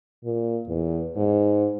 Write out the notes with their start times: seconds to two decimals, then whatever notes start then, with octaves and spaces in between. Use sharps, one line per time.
0.24 A#2
0.68 E2
1.16 G#2